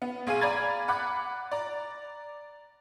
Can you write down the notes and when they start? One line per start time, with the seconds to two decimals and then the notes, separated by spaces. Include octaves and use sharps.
0.02 B3
0.27 B1 G#4 F5 G#5 D#7
0.41 D5 F5 A#5 B5 G#6 A6
0.88 F#5 B5 D6 F#6
1.51 D5 A#5